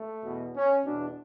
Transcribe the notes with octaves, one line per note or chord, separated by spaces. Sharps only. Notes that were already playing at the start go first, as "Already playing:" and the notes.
Already playing: A3
E2 B2
C#4
E2 B2 D4